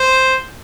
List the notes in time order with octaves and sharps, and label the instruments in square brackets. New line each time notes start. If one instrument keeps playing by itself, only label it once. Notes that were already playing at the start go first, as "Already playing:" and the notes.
Already playing: [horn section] C5